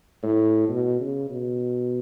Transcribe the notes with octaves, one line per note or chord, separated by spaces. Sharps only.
A2
B2
C#3
B2